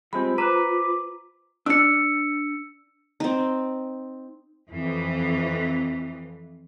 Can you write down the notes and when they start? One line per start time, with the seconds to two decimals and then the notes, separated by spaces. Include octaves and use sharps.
0.13 G3 G#3 C4 F4 B5
0.38 B4 C5 A#5 D6
1.66 D4 D5 E6 C#7
3.20 C4 D#4
4.70 F2 E3